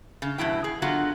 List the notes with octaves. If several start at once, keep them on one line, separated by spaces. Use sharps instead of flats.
C#3
G2 B2 E3 E4 G5
G#4
D3 F#3 B3 F4 F#4